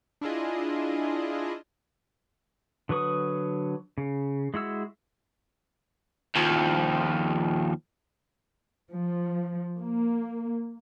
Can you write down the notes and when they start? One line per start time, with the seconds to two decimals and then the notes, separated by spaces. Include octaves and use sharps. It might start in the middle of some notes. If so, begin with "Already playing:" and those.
0.21 D4 E4 F4 G#4 D#5
2.89 D3 F#3 B4 C#6 D#6
3.98 C#3
4.54 G#3 E4 F#4 E6
6.36 D#2 F3
8.92 F3
9.81 A#3